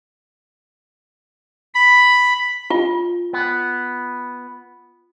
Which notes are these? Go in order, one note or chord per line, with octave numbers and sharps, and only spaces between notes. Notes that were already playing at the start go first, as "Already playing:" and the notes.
B5
F4
B3